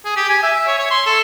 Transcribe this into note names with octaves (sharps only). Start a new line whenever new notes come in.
G#4
G4
G#5
E5
C#5
C#5
C6
A4